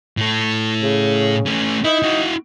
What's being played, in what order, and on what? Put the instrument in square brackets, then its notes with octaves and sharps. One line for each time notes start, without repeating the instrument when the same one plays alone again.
[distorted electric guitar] A2 A4
[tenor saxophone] C#3
[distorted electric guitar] A3 C#4
[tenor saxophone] D#4 [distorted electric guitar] E4
[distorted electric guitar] E4 F#4